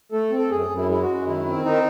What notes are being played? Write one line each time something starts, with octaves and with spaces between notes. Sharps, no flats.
A3 A4
C4
A4
F#2 G#4
F#2
E4
G#3 E4
F#4
F#2
D#3 E4
C4
D#3 D#4